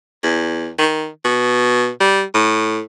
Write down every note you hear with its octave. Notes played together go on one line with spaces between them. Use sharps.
E2
D#3
B2
G3
A2